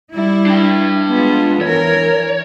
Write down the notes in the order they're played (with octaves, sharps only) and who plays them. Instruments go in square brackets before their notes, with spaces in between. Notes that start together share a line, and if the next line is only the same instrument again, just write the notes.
[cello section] G3 E4
[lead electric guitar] D4 G5
[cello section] G#3 B3 F4
[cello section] E3 A#4 [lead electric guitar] C#5